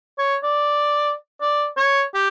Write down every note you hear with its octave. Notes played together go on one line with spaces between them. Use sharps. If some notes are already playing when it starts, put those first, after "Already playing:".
C#5
D5
D5
C#5
G4